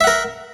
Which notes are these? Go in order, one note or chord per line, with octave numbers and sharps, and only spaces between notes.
A#4 E5 F#5